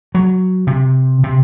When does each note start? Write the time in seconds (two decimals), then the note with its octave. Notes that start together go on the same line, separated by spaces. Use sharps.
0.15 F#3
0.67 C3
1.24 C3